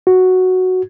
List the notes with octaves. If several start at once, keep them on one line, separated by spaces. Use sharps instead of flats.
F#4